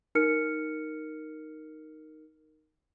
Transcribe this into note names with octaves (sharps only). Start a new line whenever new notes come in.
D#4 A#4 F6 C#7